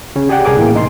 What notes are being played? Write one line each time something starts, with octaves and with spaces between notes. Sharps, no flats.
C#3 C#4
G4 G#4 D5 F#5 G5
C2 G#4 A#4 D6 D#6
A2 E3 A#3
C2 D#4 C6